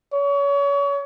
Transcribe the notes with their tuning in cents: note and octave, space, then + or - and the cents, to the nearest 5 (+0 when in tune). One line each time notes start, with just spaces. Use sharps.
C#5 +30